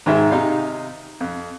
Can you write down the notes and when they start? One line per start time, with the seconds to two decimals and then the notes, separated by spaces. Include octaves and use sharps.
0.06 G#2 D#3 G#3 E5
0.31 C3 D#4 F5
1.21 F2